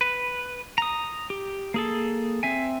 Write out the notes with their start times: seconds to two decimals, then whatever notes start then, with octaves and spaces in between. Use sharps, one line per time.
0.01 B4
0.78 A#5 D#6
1.30 G4
1.74 A#3 G#4 A4
2.43 C4 E5 G#5